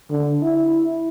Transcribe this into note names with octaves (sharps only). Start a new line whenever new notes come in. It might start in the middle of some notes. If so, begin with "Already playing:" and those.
D3
E4